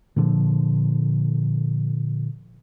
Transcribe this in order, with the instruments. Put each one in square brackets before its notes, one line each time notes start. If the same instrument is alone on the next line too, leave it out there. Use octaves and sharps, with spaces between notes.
[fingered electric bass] A#2 D3 F3